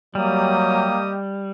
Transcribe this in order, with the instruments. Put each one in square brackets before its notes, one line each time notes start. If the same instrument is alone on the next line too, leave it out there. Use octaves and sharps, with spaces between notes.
[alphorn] F#3 [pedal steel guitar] G3 [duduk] A#3 [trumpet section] G4 D#5 D#6